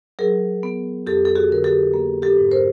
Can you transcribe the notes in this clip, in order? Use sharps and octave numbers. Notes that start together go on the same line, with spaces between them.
F#3 G#4 A#4
B3
F2 G4 A4
A4
F#4 G#4
D3 A#4
G4 A4
A#3
G4 A4
G#2
A#4 C5